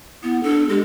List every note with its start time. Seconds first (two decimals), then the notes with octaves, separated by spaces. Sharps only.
0.23 B3 E4
0.43 D4 A4
0.69 G#3 G4